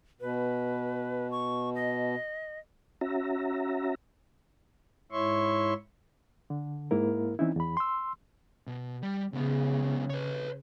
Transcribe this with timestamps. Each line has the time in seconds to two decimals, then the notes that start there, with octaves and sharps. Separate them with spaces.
0.20 B2 B4
1.31 C#6
1.75 D#5
3.01 C#4 F#4 E5 A#5
5.12 G#2 E4 C#5 E5 C6 C#6
6.50 D3
6.91 G#2 A#3 E4 A#4
7.39 E3 C4 C#4 D#4 E4
7.56 E2 B5
7.77 C6 E6
8.67 B2
9.03 G3
9.33 C#2 C#3 B3
10.10 B4 C#5